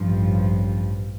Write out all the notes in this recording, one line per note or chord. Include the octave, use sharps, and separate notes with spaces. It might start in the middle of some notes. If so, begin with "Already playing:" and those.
Already playing: A1 G2 F3